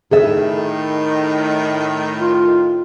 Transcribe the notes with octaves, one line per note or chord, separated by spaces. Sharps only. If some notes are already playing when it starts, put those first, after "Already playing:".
A2 D#3 G#4 A4 E5
F4